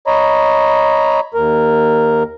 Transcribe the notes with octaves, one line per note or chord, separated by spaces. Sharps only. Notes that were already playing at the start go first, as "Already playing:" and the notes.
C#5 D#5 A#5 B5
D#2 A#4